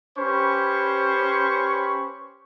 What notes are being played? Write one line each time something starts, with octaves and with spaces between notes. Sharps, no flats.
C#4 G4 B4 C5 B5 C#6